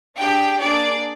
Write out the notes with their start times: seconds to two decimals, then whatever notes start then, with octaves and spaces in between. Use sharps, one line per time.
0.18 D4 G4 G#4 G5
0.60 A#3 D4 G#4 D5